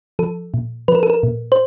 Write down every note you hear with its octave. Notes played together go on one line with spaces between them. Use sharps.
F3 A4
A#2
F3 B4
A#4
A4
A#4
A#2
C5